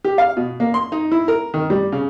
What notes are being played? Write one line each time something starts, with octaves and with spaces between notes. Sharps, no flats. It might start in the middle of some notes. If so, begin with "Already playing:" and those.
G4
F5
B2
A#3
C6
D#4
E4
A#4
D#3
G3
C#3